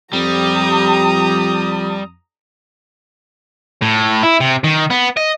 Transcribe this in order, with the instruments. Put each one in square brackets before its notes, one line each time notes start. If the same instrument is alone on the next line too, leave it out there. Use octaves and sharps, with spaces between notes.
[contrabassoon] F2 [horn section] F3 G4 [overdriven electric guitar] G3 [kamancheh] A#5 D#6
[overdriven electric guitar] A2
E4
C3
D#3
B3
D#5